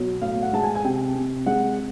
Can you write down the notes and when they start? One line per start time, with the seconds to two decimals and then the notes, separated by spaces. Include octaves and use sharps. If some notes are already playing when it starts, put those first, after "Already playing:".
Already playing: B2 F#3
0.22 A2 F5
0.42 F#5
0.53 G#3 A5
0.63 G#5
0.75 G#5
0.84 C3 G5
1.15 C3
1.46 G#3 F#5